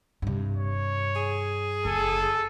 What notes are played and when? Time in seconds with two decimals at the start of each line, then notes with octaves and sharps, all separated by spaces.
0.22 G2 C3
0.57 C#5
1.16 G#4
1.85 F#1 A4